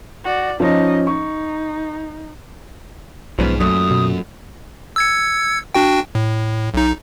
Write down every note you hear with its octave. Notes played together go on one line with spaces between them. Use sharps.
F#4 D5
F3 C#4 D#4 D#5
D#4 C#6
B1 G#2 F3 B3 C#4
F#2 A#2 F#3 A3 D#6
B2
E6 G#6 C#7
D4 F#4 G5
A2
B1 D#4